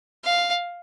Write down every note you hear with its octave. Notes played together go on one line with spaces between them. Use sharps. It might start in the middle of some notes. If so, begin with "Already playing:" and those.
F5